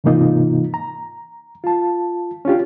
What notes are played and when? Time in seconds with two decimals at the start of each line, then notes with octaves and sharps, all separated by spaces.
0.04 G#2 C3 E3 A#3 D#4 F4
0.74 A#5
1.64 F4 A5
2.45 C#4 D4 F4 G4